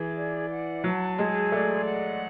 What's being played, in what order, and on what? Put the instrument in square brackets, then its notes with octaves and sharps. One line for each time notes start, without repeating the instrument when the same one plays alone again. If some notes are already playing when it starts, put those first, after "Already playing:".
Already playing: [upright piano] E3 [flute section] G#4
[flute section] D5
F#5
[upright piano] F#3 [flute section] A5
[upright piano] G#3 [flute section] G#4
[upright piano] A3 [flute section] D5
[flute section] F#5